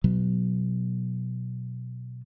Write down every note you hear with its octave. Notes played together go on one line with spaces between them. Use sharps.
B2 F#3 B3